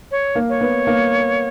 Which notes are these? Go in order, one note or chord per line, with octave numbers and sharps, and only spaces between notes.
C#5
A#3
C#5
B3
A#3